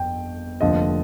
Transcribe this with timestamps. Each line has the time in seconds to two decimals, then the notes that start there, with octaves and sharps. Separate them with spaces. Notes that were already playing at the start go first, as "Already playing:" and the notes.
Already playing: G1 F2 G5
0.61 F1 D#2 D3 F3 D#5